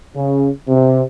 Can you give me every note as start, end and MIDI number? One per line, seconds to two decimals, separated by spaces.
0.16 0.49 49
0.69 1.02 48